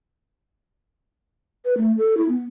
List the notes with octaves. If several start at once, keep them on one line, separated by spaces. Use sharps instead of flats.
B4
A3
A4
E4
B3